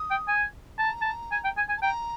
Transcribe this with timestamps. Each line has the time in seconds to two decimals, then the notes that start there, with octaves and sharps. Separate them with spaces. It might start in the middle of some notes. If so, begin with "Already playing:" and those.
Already playing: D#6
0.11 G5
0.28 G#5
0.79 A5 A#5
1.02 A5
1.31 G#5
1.44 G5
1.57 G#5
1.69 G#5
1.77 A5
1.82 G5 A#5